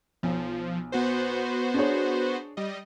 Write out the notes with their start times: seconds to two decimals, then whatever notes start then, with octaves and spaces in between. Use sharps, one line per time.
0.23 B1 F3
0.92 B3 F#4 C5
1.74 D4 G#4 C#5
2.57 G3 D#5